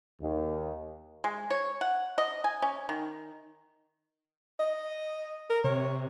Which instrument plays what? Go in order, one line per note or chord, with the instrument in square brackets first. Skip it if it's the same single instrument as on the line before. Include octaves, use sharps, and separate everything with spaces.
[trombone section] D#2
[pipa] G#3
C#5
F#5
D#5
G#5
C#4
D#3
[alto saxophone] D#5
A#4
[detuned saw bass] C3 [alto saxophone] C#5